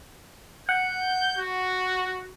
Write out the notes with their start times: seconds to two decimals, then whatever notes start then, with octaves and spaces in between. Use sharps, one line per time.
0.69 F#5 G6
1.38 F#4